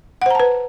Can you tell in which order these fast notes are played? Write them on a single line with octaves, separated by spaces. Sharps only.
F#5 C5 A#5 A5 B4